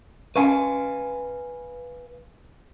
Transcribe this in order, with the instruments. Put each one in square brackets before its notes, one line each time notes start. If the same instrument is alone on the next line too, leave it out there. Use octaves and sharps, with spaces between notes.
[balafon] C#4 C#6 [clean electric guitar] B4 F5 G#5